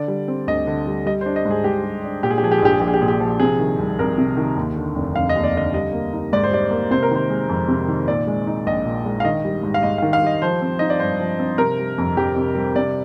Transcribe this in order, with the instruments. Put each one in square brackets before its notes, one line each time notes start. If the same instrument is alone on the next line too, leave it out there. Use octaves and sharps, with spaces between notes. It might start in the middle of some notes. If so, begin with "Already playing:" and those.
Already playing: [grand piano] D3 D5
G3
C4
D2 D#5
D3
G3
G3 D#5
C5
D4
D#5
G#2
G#4
G#2 G4
G3
D4
A#2 G4
G#4
G4
F3 G#4
G4
G#4
A#1 G4
G#4
A#1 G4
G#4
G4
A#2 G#4
G4
F3
C3 G#4
D#3
C2
C2 A#4
C3
D#3
D#2
D3
F1
F1 F5
D#5
D#2
D5
D3 D#5
G3 D#5
A#3
D#4
G#2 D5
C5
G3 D5
A#3
C3 C5
A#4
D#3 C5
G#3
F2
C3
D#3
A#2 D5
G#3
D#4
A#1 D#5
A#2
G#3
F5
D#3 D#5
G3
G#2
F5
G#2 D#5
F5
D#3
F5
G3 D#5
F3 C5
C4
D#4 D#5
D5
G2 C5
F3
C4
C3 A#4
G3
F2
F2 G4
C3
G3
C3 D5